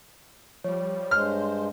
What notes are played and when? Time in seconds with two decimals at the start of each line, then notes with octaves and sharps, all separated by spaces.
0.64 F3 G3 C#5
1.11 G2 G#3 C5 F6